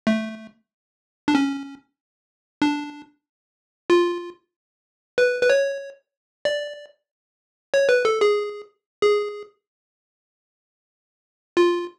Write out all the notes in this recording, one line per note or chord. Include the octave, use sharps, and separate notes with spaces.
A3
D4
C#4
D4
F4
B4
B4
C#5
D5
C#5
B4
A4
G#4
G#4
F4